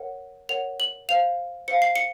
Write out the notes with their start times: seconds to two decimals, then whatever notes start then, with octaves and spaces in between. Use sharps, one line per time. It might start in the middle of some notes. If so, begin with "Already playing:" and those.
Already playing: A#4 C#5 F#5
0.49 A#4 C#5 F#5 F7
0.80 F#7
1.09 C5 F5 F7
1.68 C5 F5 C#7
1.82 C7
1.96 C#7